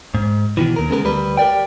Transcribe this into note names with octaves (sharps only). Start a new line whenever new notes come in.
G#2
B2 D#3 E3
D#2 A#4
C#3 G#3 B3 A#4
D2 G3 B4
G4 A#4 D5 G5